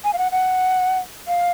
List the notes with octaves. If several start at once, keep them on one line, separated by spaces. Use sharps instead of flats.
G#5
F5
F#5
F#5
F5